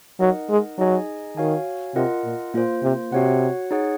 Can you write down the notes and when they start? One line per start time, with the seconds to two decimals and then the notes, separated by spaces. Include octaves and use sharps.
0.20 F#3 D#4 A#4 D#5 F#5
0.50 G#3
0.79 F#3 D#4 G#4 D#5 G#5
1.37 D#3 F#4 C#5 F5 G#5
1.95 C3 F4 A#4 D#5 F#5
2.24 A#2
2.54 A#2 A#3 F4 C5
2.83 C3
3.12 C3 F#4 C#5 F#5
3.70 D#4 G#4 C#5 F#5